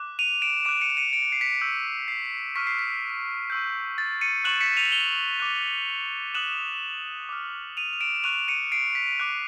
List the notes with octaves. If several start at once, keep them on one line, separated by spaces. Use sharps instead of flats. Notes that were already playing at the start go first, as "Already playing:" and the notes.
Already playing: D6 F#6
D#7 F7
D7 E7
D6 F#6 D7 E7
C#7 D#7
C#7 D#7
D7
C#7
C7
B6 C#7
C#6 E6 G6
C7
C#6 F6 B6
C7
B6
C#6 E6 G6
A6
C#7 D#7
C#6 F#6 E7 F#7
B6 C#7
D#7 F7
F7 G7
D6 F#6
D#6 F#6 E7 F#7
D6 F6
D#7 F7
F7
D7 E7
C#6 F#6 D#7 F7
C#7 D#7
C7 D7
B6
D6 F#6